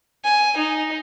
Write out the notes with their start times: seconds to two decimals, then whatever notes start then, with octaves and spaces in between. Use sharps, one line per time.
0.24 G#5
0.57 D#4